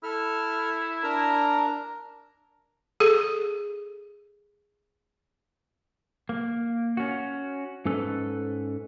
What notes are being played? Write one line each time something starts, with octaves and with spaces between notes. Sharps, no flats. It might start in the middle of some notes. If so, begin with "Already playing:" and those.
E4 A4 F6
D4 A#4 A#5
G#4 A4
A#3
C#4 F#4
G#2 C#4 A4 B4